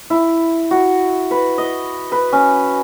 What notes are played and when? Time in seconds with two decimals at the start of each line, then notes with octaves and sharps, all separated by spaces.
0.10 E4
0.71 F#4
1.31 B4
1.58 D#5
2.12 B4
2.33 C#4